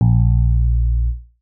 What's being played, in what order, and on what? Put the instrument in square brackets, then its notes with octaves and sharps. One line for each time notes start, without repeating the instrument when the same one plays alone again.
[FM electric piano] A#1